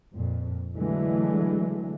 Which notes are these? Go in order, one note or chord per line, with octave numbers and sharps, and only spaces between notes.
F2 A#2
D3 E3 F#3 G#3 A3